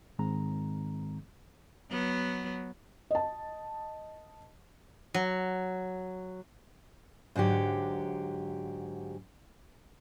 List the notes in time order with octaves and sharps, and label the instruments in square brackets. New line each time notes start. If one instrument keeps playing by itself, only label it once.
[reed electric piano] G#2 D#3 G#3 C4 A#5
[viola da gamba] F#3 B3
[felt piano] D#5 A5
[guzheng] F#3
[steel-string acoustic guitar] G#2 D3 F#3 G4